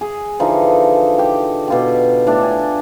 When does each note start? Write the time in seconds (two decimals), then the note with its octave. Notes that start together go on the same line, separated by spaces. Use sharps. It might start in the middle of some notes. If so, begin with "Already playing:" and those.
0.01 G#4
0.40 D3 E3 F3 D#4
1.18 G4 G5
1.68 B2 F4 G4
2.27 A2 D4 G4 A4
2.43 G#5